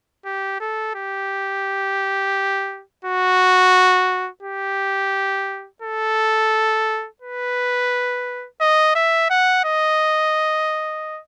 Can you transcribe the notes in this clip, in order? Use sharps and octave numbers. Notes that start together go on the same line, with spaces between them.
G4
A4
G4
F#4
G4
A4
B4
D#5
E5
F#5
D#5